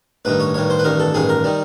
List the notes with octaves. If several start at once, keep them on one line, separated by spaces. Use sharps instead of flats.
A1 G2 D#3 B4
C#5
A1 G2 D#3 C#5
C5
B4
A1 G2 D#3 A#4
A4
A1 G2 D#3 G#4
A#4
D#3 G3